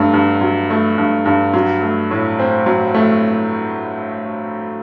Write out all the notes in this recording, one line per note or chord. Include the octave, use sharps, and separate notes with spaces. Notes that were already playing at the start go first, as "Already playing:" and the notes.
Already playing: G2 F#3 A3
G2
F#3
A3
G2
G2
F#3
A3
A2
C4
F#3
A3